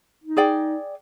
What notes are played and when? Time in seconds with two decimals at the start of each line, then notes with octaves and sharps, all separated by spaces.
0.24 D#4
0.37 G#4 D5 G5